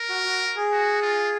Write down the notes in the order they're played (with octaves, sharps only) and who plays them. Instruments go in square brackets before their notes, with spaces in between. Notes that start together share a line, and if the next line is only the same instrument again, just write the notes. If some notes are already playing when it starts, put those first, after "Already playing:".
Already playing: [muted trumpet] A#4
[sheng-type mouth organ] F#4
F#4
G#4
[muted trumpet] F#4
F4